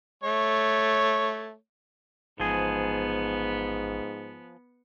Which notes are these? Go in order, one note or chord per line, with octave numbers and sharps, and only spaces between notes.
A3 C#5
A1 G#2 F3 B3 G#4